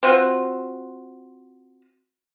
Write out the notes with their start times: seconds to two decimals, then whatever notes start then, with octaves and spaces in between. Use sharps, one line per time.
0.03 C4 F4 F#4